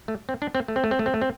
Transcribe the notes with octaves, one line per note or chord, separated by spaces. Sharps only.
A3
C4
D4
C4
A3
C4
A3
C4
A3
C4
A3
C4